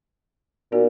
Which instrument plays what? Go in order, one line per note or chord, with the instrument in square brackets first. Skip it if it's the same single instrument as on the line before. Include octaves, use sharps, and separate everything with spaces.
[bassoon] A#2 [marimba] B3 D#4 F#4